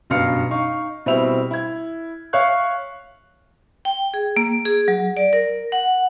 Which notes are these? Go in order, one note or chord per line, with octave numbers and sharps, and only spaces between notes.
F#1 G2 B2 F5 F6 C#7
D#4 F5 C#6
B2 G3 C4 E4 E5 F7
E4 G#6
C#5 E5 F5 C#6 F#6
G5
G#4
A#3
G#4
F#3
D5
A#4
F#5